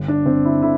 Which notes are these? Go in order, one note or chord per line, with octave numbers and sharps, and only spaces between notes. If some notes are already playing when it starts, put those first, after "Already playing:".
Already playing: G1
D4
G1 C4
E4
D3 E4